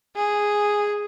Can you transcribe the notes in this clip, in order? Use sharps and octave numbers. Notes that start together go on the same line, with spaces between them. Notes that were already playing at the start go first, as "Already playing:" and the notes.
G#4